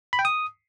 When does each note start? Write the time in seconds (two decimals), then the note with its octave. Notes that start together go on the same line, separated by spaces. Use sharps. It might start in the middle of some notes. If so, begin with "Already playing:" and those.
0.13 B5
0.19 G5
0.25 D#6